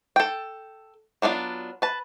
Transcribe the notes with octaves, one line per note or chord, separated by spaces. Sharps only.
A4 G5
F#3 B3 D4 E4 F4
B4 A5